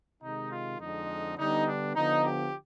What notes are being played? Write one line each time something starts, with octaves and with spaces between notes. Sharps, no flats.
C3 D#3 G#3 D#4
F4
F2 D3 G#3 C4 D#4
D3 G3 B3 D4 D#4
D4
D3 F3 B3 D#4
G4